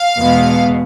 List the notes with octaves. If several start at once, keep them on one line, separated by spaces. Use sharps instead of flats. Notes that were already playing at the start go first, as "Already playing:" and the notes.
Already playing: F5
E2 B2 G#3 B3